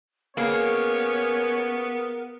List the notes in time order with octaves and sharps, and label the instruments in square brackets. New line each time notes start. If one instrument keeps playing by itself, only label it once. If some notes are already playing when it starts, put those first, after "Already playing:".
[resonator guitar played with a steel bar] A#3 G#4 [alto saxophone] B3 [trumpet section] C#4 C#5 [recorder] A#4